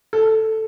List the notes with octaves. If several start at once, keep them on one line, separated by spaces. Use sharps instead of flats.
A4